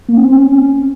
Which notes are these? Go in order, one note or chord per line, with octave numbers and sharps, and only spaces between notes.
A#3
C#4
C4
C#4